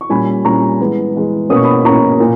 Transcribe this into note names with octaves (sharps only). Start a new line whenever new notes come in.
C#6
A#2 G3 C#4 G#5 B5
A#2 G3 C#4 A#5 C#6
E3 G#3 B3
E3 G#3 B3
B2 A#3 C#4 D#6
C#6
B5 D#6
B2 A#3 C#4 A#5 C#6
A#2